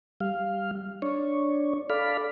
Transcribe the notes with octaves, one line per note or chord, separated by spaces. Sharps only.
G3 F5
D4 C#5
A4 D5 F5 B5